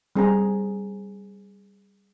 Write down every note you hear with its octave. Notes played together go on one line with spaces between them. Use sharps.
G3 C4 G#4 C5 G#5 A#5